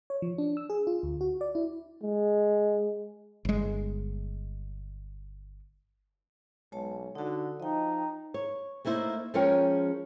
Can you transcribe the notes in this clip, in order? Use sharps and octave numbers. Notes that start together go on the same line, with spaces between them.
C#5
F3
D4
E6
G#4
F4
D2
F#4
D5
E4
G#3
G1 G#3
B1 G#3 C#5 A5
D3 D#4 F#4
F3 D#4 D#5 G5
C#5
A3 A#3 D#4 E4 C5
F3 G#3 C#4 A#4 C#5 G5